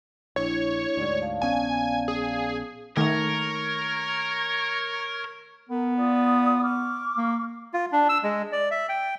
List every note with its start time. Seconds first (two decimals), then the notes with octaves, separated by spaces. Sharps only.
0.36 A#1 D4 E4 C#5
0.97 D2 G#2 D5
1.21 D5 F5 A5
1.42 A#1 B3 C#4 G#5
2.08 G#4
2.97 D#3 A3 A#4 C#5 A#5
5.69 B3 A#4
5.97 F4 D5 D#6
6.63 C#6 D6 F6
7.17 A#3
7.74 F4
7.92 D4
8.09 E6
8.23 G#3
8.52 D5
8.71 E5
8.89 G5